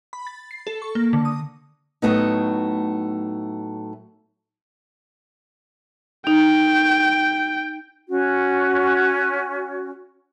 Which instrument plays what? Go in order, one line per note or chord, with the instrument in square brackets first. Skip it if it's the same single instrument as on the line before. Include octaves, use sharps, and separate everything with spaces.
[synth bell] B5
A6
C7
A4
C#6
A#3
D3
D#6
[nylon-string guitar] A2 F#3 A3 B3 D#4
[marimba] D#4 [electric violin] G5
[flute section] C#4 F#4